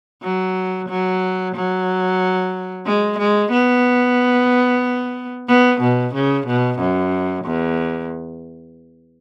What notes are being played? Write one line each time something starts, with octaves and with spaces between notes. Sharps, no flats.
F#3
F#3
F#3
G#3
G#3
B3
B3
B2
C#3
B2
F#2
E2